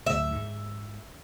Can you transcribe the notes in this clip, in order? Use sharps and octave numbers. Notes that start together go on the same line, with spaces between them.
D1 D2 E5
G#2